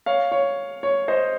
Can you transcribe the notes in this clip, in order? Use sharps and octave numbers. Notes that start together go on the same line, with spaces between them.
C#5 F5
C#5
C#5
C5 D#5